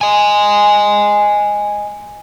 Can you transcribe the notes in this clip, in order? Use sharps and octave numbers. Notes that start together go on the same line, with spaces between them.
D#5 G#5